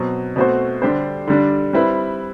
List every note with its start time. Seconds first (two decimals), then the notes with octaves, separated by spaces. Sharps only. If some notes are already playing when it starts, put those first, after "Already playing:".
Already playing: B2 F#3 C4
0.36 B2 A3 C4 F#4 C5
0.82 D3 G3 D4 G4 C5
1.28 D3 G3 D4
1.73 G3 C4 E4 B4